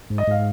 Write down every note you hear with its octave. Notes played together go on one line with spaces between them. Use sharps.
G#2
D#5
G#2 F5